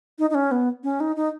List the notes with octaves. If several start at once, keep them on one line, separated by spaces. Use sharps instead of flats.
D#4
D#4
C#4
B3
C#4
D#4
D#4